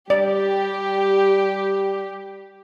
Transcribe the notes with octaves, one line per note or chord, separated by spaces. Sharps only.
G3 G4 D5